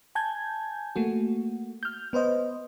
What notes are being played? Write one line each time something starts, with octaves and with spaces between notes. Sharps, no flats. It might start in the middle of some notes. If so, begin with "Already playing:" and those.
G#5 A5 G6 G#6
A3 A#3 F#4
F6 G6
B3 B4 C5 D#5